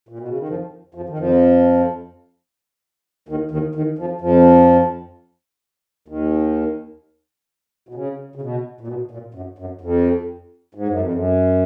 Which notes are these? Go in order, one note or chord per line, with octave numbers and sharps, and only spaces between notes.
A#2
B2
C#3
D#3
F2 F3
F2 F3
D#3
F2 F3
D#2 D#3
D#2 D#3
D#2 D#3
F2 F3
F2 F3
D#2 D#3
B2
C#3
C#3
B2
A#2
B2
A#2
F#2
F#2
F2
G#2
F#2
F2
F#2